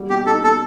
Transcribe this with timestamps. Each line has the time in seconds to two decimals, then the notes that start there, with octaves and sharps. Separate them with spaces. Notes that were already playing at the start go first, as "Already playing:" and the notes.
Already playing: G3 F#4
0.10 B2 G4
0.26 D#4 A4
0.44 B2 A4